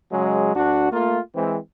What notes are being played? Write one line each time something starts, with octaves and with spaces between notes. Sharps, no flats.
C#3 F#3 G#3
D2 D4 F#4
A3 A#3 F4
E3 G#3 C4